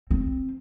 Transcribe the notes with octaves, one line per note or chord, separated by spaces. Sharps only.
C4